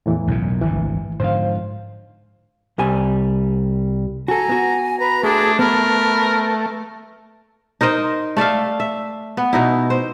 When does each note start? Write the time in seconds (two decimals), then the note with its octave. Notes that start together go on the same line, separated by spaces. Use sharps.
0.06 E2 A2 E3
0.28 B1 F#2 A#2
0.61 G#1 D2 G2 E3
1.20 G#2 D3 F3 C5 F5
2.78 C2 G3 G#5
4.28 F#4 A4 G#5 A#5
4.49 B3 F#4
5.00 B4 A#5
5.23 A3 D4 G#4
5.59 B3 A#4 B4
7.81 D#4 A#4 C5 D#5
8.37 A3 D5 E5 F5
8.80 E5
9.37 B3
9.53 B2 D#4 E4
9.90 C5